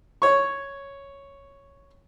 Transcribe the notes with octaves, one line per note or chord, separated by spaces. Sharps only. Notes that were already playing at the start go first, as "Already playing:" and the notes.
C#5 C#6